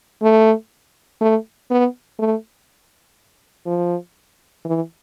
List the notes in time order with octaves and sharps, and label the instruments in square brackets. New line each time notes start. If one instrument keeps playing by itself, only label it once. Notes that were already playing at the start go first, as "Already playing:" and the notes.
[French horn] A3
A3
B3
A3
F3
E3